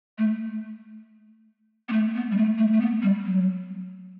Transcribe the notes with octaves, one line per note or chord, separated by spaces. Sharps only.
A3
B3
A3
B3
G3
A3
A3
A3
B3
G3
F#3